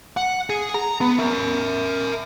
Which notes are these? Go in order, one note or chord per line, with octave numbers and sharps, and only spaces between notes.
F#5
G#4
A#5
B3
A#4 E5